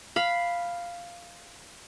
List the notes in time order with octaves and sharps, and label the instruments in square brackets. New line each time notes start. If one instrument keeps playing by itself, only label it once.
[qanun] F5 B5